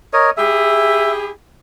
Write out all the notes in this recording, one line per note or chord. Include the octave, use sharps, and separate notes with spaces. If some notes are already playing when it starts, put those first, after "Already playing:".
A#4 C#5 D#5
E4 G4 G#4 E5